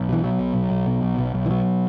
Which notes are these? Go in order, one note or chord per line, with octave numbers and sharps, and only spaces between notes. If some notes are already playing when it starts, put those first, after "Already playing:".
Already playing: B1
B2 E3
B2 F#3
B1
B1
B1
B2
B1
B1
B1
E3
B2 F#3